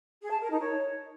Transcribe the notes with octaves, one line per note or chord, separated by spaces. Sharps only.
G#4
A5
A#4
D#4
C#5